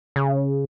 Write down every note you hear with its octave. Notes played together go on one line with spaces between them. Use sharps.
C#3